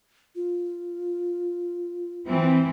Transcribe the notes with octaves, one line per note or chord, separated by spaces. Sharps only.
F4
E3 C4